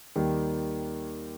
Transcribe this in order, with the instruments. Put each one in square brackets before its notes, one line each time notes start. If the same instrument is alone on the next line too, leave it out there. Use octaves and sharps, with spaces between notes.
[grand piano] D#2 D#3 G3